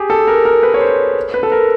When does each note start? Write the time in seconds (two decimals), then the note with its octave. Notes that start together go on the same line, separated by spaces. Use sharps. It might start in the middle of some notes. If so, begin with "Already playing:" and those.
Already playing: G4 G#4
0.10 A4
0.27 A#4
0.45 A#4
0.63 B4
0.74 C#5
0.81 C5
1.34 B4
1.43 A4
1.52 A#4